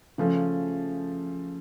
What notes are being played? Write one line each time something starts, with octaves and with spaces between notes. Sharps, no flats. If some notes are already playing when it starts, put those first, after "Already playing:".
C#3 F3 A3 C#4